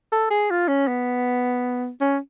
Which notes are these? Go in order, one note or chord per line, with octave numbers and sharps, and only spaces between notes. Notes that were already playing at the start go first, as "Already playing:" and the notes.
A4
G#4
F4
C#4
B3
C#4